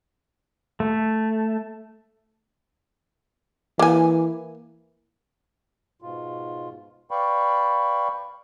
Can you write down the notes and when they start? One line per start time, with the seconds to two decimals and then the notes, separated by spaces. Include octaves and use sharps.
0.80 A3
3.79 E3 A#3 G#5
6.02 G#2 B2 F4
7.11 B4 D5 F5 G5 B5 C#6